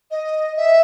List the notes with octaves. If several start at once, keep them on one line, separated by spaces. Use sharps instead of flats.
D#5
E5